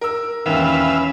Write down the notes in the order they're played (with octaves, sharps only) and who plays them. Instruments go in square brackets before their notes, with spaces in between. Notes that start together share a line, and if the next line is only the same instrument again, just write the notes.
[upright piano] A#4 E6
[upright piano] E1 D#2 [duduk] C#4 [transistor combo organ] B4 E5 F5